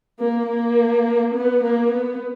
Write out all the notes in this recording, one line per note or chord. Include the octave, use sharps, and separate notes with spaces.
A#3
A#3
B3
A#3
B3